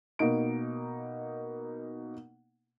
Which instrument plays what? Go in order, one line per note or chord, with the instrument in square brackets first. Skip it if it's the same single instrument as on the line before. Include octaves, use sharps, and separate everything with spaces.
[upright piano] B2 A#3 D#4 D7